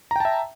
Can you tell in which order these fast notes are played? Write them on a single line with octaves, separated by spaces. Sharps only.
A#5 G5 A5 E5